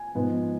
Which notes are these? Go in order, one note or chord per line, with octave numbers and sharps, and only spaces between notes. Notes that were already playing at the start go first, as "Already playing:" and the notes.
Already playing: G#5
G#2 F3 B3